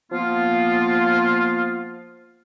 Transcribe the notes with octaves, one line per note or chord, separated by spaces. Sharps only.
F3 A#3 B3 F4